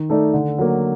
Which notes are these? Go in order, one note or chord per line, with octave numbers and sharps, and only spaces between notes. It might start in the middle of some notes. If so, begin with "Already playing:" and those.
Already playing: D#3
A3 D#4 A4 D5
D3
F#3 A#3